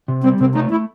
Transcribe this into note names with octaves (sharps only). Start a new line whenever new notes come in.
C3
G3 C4
C3 C4
A3 D#4
A3 E4